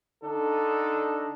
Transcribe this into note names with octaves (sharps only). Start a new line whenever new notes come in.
D3 D4 D#4 A4